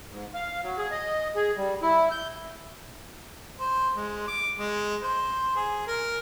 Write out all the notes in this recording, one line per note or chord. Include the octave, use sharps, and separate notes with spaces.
G#2
F5
F#3
G#4
D#5
G#4
G3
E4
G6
C5
G#3
D6
G#3
C5
G#4
A#4